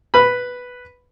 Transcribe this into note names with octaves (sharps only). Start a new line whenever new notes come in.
B4 B5